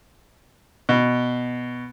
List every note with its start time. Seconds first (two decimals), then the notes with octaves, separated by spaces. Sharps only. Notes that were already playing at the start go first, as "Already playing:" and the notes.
0.89 B2